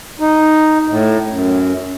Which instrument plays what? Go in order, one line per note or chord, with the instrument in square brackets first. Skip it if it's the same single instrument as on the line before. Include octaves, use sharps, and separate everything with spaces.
[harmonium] D#4
A2
F#2